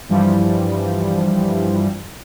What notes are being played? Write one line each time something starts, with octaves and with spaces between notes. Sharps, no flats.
G2 E3 F3 G3